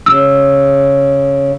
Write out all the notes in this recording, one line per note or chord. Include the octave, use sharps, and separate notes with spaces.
C#3 E6